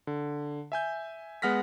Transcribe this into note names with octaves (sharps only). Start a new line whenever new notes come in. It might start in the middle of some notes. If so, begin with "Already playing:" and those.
D3
E5 G#5 G6
G#3 B3 F#5 F6 A#6 B6